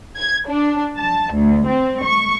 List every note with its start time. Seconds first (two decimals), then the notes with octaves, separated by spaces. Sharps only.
0.17 G#6
0.48 D4
0.99 A5
1.35 D2
1.67 C4
2.06 C#6